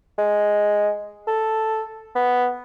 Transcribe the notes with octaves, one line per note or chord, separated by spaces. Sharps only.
G#3
A4
B3